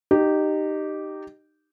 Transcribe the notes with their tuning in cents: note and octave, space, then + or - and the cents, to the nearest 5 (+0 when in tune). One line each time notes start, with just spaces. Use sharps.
D#4 -20 G4 -10